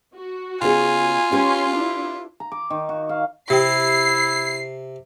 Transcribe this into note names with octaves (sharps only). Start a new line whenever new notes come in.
F#4
C#3 B3 F4 G#4 G#5
C#4 G4 B4 F5 C6
D4 E4
A#5
D6
D#3
F#4
F5
C3 E4 G4 G5 C7